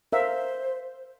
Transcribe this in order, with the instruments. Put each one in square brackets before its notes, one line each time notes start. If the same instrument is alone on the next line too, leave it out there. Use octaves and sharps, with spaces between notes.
[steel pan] A#4 E5 F5 [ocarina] C5